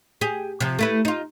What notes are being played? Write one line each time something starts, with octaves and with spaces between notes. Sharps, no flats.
G4 G#4
C3 F3
A3 E4 B4
D#4 F4